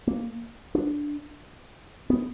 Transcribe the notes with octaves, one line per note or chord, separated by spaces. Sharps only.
A#3
D4
B3